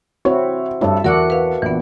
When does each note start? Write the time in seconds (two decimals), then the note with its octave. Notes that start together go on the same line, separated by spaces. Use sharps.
0.25 C4 E4 F#4 C#5
0.81 G2 E4 A4 C#5
1.04 E2 F#4 A#4 D5 F#5 D6
1.30 B4 F5
1.62 A#1 E3 B3